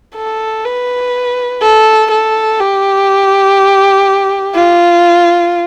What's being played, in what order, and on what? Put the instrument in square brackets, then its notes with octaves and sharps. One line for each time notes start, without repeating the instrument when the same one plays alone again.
[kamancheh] A4
B4
A4
A4
G4
F4